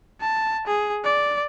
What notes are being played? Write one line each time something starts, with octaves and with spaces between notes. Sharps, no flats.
A5
G#4
D5